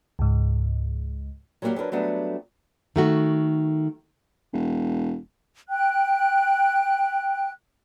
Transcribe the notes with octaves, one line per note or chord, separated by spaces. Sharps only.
C#2 G#2
F#3 G3 A#3 B3 F#4 G4
F#3 D4 A#4 B4
F#3 G3 A3 B3 D4
D#3 A3 F#4
E1
G5 F#6